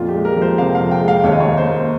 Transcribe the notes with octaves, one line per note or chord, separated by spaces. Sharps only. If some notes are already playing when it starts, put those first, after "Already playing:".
Already playing: F2 A#2 F4
G4
G#3
A#4
F3
C5
C3 F5
F5
F2
G5
G#3
F5
D#2 C#5
D#5
C#5
D#2
C5
A#3